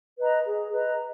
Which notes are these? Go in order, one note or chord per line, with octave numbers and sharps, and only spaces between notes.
B4 D#5 A#5
G#4
B4 D#5 A#5